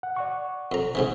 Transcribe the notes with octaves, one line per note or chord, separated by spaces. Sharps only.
F#5
D5 F#5 C#6
F2 A#5
G#2 C3 E3